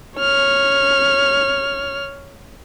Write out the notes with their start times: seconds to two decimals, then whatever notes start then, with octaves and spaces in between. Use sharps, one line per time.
0.18 C#5 F6